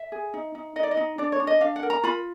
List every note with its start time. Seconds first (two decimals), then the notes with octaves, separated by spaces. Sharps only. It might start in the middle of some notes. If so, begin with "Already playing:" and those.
Already playing: E5
0.12 G#4
0.34 D#4
0.55 D#4
0.76 D#4 D#5
0.83 D5
0.91 D#5
0.97 D#4
1.18 D4 D5
1.32 C#5
1.40 D4
1.47 D#5
1.61 D4 F5
1.76 F#5
1.83 A#4
1.90 A#5
2.03 F4 B5